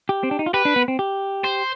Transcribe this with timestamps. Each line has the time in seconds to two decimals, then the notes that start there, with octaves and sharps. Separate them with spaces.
0.09 G4
0.23 C4
0.31 D4
0.39 D#4
0.46 F4
0.54 G4 B4
0.65 D4
0.76 B3
0.88 C4
0.99 G4
1.44 C5